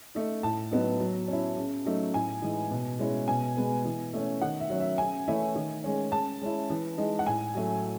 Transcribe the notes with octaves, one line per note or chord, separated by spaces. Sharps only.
A3 D#4
A2 A5
F#3 B3 D#4
F#3
C#4 E4
C#3
F#3 A3 D#4
A2 G#5
E3 G#3 D#4
B2
G#3 C#4 E4
B2 G#5
G#3 B3
E3
A3 C#4
D#3 F#5
E5
F#3 C#4
E5
C#3 G#5
E3 A3 C#4 E4
D#3
G#3 C#4
C#3 A5
G#3 C#4 E4
E3
G#3 D#4
F#5
A2 G#5
F#3 A3